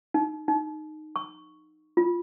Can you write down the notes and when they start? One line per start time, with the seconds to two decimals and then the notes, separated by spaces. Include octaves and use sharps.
0.14 D#4
0.48 D#4
1.16 C#6
1.97 F4